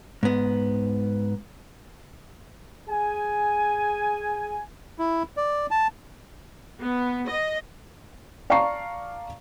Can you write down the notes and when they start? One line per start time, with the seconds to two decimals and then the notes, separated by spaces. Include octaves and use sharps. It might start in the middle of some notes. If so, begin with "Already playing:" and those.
0.23 G#2 B3
2.89 G#4 G#5
4.99 E4
5.37 D5
5.71 A5
6.79 B3
7.27 D#5
8.50 D5 F5 A5 A#5 C#6 C7